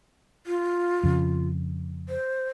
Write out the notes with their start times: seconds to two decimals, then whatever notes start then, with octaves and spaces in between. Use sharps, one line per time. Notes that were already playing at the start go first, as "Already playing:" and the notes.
0.47 F4
1.03 F2 C#3
2.09 C5